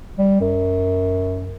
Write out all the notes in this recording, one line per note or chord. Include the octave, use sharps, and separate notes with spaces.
G3
F#2